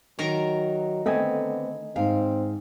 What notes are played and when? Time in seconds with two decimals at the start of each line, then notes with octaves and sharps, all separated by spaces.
0.19 D#3 F#3 A#4 A#5
1.06 D3 A3 B3 C4 D#5 G#5
1.96 G#2 C4 F5